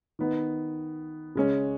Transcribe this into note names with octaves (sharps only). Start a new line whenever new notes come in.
D#3 B3 D#4
C#3 G#3 C#4